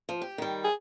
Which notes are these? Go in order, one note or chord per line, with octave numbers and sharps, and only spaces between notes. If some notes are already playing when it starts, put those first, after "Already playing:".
F3
G4
D#3 G3
G#4